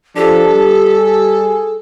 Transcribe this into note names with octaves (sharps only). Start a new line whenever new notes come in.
F3 D4 G4 A4
G3
G#4